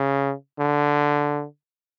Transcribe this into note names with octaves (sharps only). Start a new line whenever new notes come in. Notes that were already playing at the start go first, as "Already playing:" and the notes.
Already playing: C#3
D3